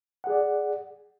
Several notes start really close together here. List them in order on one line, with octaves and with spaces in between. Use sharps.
F#5 G#4 D5